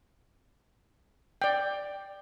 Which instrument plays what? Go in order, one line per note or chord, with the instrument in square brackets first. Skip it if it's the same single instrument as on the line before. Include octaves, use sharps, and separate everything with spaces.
[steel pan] D5 G5